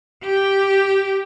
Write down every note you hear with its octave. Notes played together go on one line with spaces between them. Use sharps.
G4